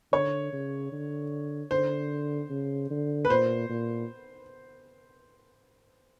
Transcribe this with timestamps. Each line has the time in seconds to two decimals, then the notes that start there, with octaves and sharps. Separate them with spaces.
0.12 D3 C#5
0.53 C#3
0.92 D3
1.71 D3 C5
2.50 C#3
2.90 D3
3.25 B4
3.30 A#2 C5
3.70 A#2